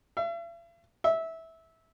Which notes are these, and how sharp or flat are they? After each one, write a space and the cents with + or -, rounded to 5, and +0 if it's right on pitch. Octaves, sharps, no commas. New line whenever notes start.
E5 +45
E5 -15